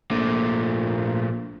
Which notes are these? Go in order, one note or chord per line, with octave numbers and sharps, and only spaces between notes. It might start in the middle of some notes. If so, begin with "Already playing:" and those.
A#1 A#2 A3